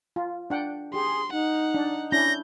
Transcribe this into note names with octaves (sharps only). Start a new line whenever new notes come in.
F4
D4 F#5 G5
G4 G#4 C6
D#4 F#5
D4
C#4 D4 E4 G6 A#6